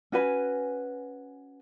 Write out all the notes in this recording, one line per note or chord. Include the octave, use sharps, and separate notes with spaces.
C#4 F#4 B4 G#5